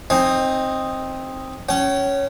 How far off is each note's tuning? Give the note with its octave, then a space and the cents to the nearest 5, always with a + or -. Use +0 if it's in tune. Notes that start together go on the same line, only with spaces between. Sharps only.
C4 +10 D#4 +0 G#5 +5
C#4 +0 G5 -45